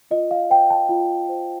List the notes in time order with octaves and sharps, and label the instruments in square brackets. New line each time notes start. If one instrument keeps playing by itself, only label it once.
[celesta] F4 D#5
F5
C5 G5
A5
F4
C5